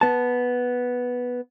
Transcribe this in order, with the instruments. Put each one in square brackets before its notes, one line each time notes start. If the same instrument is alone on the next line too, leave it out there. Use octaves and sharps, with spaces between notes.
[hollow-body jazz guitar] B3 A5